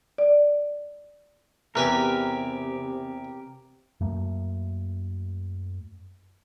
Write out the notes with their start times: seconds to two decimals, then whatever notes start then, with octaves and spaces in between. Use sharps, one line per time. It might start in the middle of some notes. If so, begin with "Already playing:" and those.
0.18 D5
1.75 E2 C3 G4 A#4 B4 G#5
4.00 F#2 A3 A#3